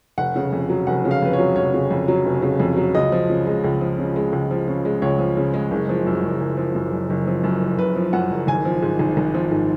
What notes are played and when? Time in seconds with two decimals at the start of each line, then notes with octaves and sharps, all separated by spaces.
0.18 F1 F#5
0.36 C#3
0.52 F2
0.69 F#3
0.87 F1 F#5
1.05 C#3
1.11 F5
1.22 F2 B4
1.33 C#5
1.39 F#3
1.56 F1 C#5
1.74 C#3
1.91 F2
2.08 F#3
2.25 F1
2.42 C#3
2.60 F2
2.77 F#3
2.95 C#2 D#5
3.12 F3
3.30 C#3
3.47 G#3
3.64 C#2
3.81 F3
3.99 C#3
4.16 G#3
4.32 C#2
4.51 F3
4.68 C#3
4.85 G#3
5.02 C#2 C#5
5.19 F3
5.37 C#3
5.54 G#3
5.71 F#1
5.89 F3
6.06 F#2
6.24 F#1
6.40 F#1
6.57 F3
6.75 F#2
6.93 F#1
7.10 F#1
7.27 F3
7.44 F#2
7.62 F#1
7.78 F#1 B4
7.95 F3
8.13 F#2 F#5
8.30 F#1
8.47 G#1 G#5
8.65 F3
8.82 G#2
8.99 G#1
9.17 G#1
9.34 F3
9.51 G#2